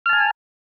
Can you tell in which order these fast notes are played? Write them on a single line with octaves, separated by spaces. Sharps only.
F6 A5 G#5